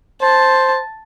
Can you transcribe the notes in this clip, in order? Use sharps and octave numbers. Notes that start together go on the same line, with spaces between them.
C5 A5